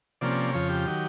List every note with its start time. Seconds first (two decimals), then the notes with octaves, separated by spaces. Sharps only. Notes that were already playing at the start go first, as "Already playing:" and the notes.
0.21 C3 F3 A#3 C#4 D5
0.54 F2 C#3 F3 C#5
0.70 G4
0.87 D#3 F#3